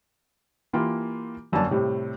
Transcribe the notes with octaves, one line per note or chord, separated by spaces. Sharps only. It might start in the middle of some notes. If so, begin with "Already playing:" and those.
E3 A#3 F4 G4 B5
G1 F#2 D3 A#3 D4 A5
A2 C3 G3